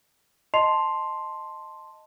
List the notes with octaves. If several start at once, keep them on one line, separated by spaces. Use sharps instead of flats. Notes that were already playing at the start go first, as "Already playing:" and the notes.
D#5 A5 C6 C7 F7